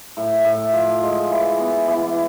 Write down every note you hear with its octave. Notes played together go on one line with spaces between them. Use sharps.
A2
A2
F3
G#3
E3
B3
E3